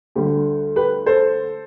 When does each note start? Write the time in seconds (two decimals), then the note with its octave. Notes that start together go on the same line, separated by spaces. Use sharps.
0.16 D2 D3 G3 G4
0.76 G4 B4
1.06 A4 C5